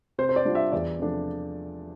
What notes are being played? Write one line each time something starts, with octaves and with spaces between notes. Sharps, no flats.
C3 C5
C5
D5
G3 D4 F4
E5
E2 D5
C3 F3 A3 D4